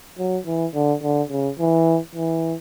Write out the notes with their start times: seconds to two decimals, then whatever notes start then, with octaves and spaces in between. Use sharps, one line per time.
0.19 F#3
0.46 E3
0.74 D3
1.03 D3
1.30 C#3
1.59 E3
2.15 E3